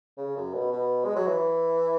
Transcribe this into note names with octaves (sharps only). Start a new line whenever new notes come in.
C#3
F#2
B2
B2
G#3
F#3
E3